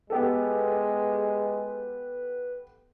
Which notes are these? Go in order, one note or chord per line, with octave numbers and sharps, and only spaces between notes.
G#3 B3 G4 A4 B4